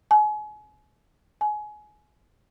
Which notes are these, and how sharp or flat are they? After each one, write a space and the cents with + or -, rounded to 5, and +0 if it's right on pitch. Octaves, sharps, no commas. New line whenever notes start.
G#5 +35
G#5 +25